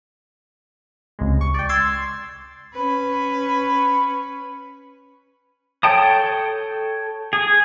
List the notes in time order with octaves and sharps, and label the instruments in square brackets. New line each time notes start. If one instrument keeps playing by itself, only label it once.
[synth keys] C#2 C3 G#3
C#6
D5 G5
C6 E6 G#6 A6 C7
[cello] C#4 B4
[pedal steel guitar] A4 C#5 G5 A5 D#6
G#4